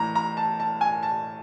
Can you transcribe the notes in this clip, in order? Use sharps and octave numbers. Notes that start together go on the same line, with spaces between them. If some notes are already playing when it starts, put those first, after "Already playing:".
Already playing: A2 E3 A#5
A#5
A5
A5
G#5
A5